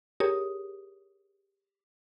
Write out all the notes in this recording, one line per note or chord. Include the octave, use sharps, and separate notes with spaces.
G4 G#4 A#4 C#5 D#6